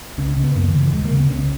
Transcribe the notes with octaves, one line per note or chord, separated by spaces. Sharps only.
C#2 C#4
C#4
C#3
B3
F#2 A#3
D#3
C#3
E3
D#2 G#3
A#3
C#3
B3
C#2 C#4